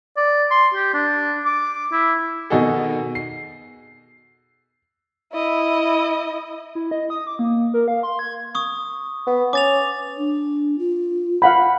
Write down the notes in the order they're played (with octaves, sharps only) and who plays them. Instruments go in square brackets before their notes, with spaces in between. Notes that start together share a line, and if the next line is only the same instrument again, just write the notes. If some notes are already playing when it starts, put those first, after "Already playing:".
[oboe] D5
C6
G4
D4
D6
E4
[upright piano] B2 D#3 D#4 F#4 G#4 A4
C7
[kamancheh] E4 D#5
[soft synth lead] E4
D#5
D#6
D6
A#3
A#4
F5
C6
G#6
[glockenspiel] C#6 D#6
[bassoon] B3
[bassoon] C#4 [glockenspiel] D6 A6 F7
[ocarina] D4
F4
[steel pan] F5 F#5 B5